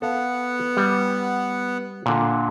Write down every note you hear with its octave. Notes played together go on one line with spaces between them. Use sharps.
B3 A4 F5 F#5
G3
A#2 D3